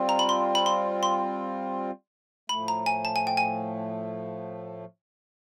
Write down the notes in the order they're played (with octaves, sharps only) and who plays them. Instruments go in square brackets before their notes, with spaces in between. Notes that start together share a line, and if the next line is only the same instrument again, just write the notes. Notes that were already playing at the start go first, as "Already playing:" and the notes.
Already playing: [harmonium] G3 C4 F4
[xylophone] A#5
B5
C6
B5
C6
C6
[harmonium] A2 F3 A3 [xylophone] B5
[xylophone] A#5
G#5
A5
G#5
G5
G#5